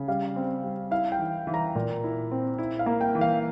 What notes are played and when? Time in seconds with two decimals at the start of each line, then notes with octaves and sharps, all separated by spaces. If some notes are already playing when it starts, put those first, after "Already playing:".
Already playing: C#3
0.08 G3 F5
0.36 C4
0.64 G3
0.91 E4 F5
1.12 G5
1.19 E3
1.47 E3
1.54 A#5
1.75 A#2
2.04 E4
2.32 C4
2.58 E4
2.79 F5
2.86 A#3
3.01 G5
3.15 E3
3.21 F5